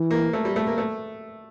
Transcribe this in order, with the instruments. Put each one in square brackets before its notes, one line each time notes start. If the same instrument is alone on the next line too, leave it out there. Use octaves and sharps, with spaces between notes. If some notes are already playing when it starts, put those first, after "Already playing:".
Already playing: [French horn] E3
[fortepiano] A#3
A3
G3
A3
A#3
A3